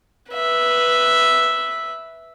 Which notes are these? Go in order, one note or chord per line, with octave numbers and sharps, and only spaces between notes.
B4 E5